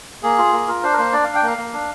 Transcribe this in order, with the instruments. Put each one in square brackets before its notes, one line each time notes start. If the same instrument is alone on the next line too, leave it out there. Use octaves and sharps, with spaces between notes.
[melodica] A#3 G#4
F4
A#3
F4 A#4
D4 C5
A#4
A#3 C5
D4 D5
D4 F5
G5
A#3 F5
A#3
D4